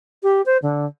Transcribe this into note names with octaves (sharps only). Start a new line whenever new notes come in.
G4
C5
D3